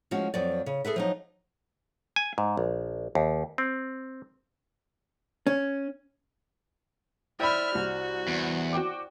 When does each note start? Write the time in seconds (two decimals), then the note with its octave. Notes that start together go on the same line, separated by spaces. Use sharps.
0.11 F3 G#3 C#4 F#4
0.34 F2 F3 F#3 D5
0.66 C#3
0.85 G#4 A4 B4 E5
0.96 F3 F#3 D#4
2.16 G#5
2.38 G#2
2.57 A#1
3.15 D#2
3.58 C4
5.47 C#4
7.40 E4 C5 D5 E5 G5 B5 F6
7.75 C2 F#4
8.27 E2
8.73 F#4 G5 D6